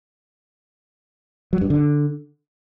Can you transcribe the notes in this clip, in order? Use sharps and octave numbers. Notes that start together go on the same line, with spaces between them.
F#3
G2
D3